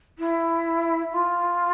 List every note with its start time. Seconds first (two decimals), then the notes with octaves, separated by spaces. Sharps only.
0.18 E4
1.12 F4